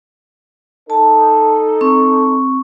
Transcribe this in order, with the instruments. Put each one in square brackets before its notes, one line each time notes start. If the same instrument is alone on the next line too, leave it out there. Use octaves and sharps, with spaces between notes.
[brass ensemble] D#4 A4 [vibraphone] A5
[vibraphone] C4 C#6